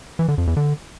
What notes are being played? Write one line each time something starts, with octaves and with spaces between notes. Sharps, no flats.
E3
D3
F2
E2
D3